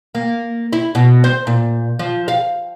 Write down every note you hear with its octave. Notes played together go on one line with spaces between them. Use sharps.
A#3
E4
B2
C5
A#2
F3
F5